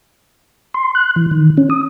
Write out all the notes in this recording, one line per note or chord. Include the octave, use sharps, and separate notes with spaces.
C6
F#6
E3
D#3
C#4
D#6